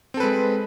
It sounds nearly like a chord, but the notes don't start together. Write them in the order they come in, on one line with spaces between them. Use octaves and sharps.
C4 A4 B4 G#3